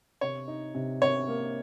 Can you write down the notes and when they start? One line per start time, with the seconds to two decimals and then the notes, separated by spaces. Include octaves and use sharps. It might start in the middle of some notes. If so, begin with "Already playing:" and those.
0.21 C3 C#5
0.48 D#4
0.74 C3
1.02 C3 C#5
1.28 A#3